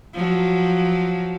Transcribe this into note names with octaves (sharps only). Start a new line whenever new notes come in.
F3 F#3